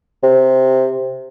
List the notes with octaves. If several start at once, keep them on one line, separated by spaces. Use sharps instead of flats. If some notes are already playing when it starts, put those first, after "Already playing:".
C3